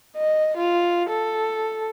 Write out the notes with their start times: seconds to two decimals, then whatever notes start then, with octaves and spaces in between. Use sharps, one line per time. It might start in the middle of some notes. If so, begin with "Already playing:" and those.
0.17 D#5
0.57 F4
1.09 A4